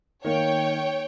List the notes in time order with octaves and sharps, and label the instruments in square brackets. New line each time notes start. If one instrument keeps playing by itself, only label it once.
[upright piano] D#3 A#3 [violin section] C#5 G5